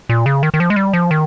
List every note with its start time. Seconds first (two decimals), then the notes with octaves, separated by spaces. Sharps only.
0.09 A#2
0.26 C#3
0.43 D#3
0.54 D#3
0.60 F3
0.70 G#3
0.76 G3
0.93 F3
1.11 D#3